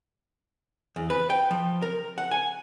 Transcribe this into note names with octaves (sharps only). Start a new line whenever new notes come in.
E2
B4
G5
F3
A#4
F#5
G#5